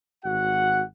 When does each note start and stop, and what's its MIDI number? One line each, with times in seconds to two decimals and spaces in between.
0.25 0.84 32
0.25 0.84 66
0.25 0.84 78